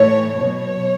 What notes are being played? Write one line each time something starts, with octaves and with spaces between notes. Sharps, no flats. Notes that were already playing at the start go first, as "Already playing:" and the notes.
Already playing: A2 E3 C#5
B2 F#3 C#5